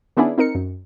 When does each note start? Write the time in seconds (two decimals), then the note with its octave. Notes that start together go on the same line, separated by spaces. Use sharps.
0.17 D#3 B3 C#4 D4 E4 G#4
0.38 C4 D#4 A#4 C#7
0.55 F#2